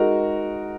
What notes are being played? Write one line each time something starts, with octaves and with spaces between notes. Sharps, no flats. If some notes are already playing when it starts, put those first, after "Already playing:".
Already playing: G#3 D#4 F#4 A#4